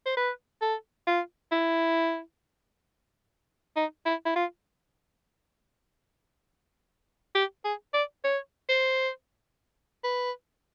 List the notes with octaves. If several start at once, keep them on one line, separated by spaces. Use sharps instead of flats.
C5
B4
A4
F4
E4
D#4
E4
E4
F4
G4
G#4
D5
C#5
C5
B4